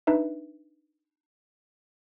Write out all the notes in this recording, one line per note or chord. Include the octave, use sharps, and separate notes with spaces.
D4 D#4 B4 E5